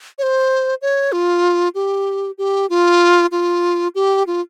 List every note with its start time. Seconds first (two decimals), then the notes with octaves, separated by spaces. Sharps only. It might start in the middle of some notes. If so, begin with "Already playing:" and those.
0.18 C#5
0.23 C5
0.82 C#5
1.12 F4
1.75 G4
2.38 G4
2.70 F4
3.32 F4
3.95 G4
4.27 F4